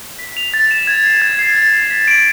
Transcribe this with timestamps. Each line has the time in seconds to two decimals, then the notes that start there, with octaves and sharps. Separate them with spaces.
0.19 B6
0.37 F7
0.54 A6
0.71 E7
0.87 G#6
1.05 C7
1.22 G#6
1.39 C7
1.56 A6
1.73 C7
1.90 B6
2.08 D7